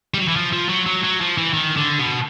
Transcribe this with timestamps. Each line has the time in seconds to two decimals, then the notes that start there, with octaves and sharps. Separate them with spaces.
0.14 G3
0.18 F#3
0.28 E3
0.36 F3
0.53 F3
0.69 F#3
0.86 F#3
1.04 F#3
1.21 F3
1.38 E3
1.53 D#3
1.77 D3
1.99 B2